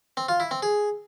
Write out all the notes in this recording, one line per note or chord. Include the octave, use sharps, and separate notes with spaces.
C4
F4
E4
C4
G#4